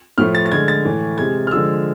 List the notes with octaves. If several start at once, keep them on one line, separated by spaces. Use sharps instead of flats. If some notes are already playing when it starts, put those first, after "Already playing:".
A2 F3 A3 F6
A6
A6
D3 G#3 G#6
A6
A2 E3 A3
C3 G#3 G#6
F6
D3 F3 G#3 E6